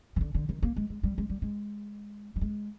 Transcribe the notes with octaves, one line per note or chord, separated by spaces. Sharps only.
D#3
D3
D3
D#3
A#3
G#3
G#3
G3
G#3
G3
G#3
G3
G#3